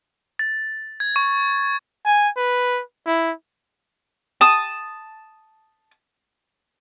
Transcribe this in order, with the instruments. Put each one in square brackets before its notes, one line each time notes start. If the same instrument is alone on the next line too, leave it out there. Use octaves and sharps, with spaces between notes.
[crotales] A6
G#6
C#6
[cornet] G#5
B4
E4
[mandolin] A5 D#6